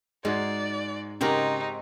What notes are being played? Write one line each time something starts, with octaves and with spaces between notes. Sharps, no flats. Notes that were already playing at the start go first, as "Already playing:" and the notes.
G#2 G#3 F#4 D5
C#3 G#3 C4 D#4 F#4 G4 A#4 G5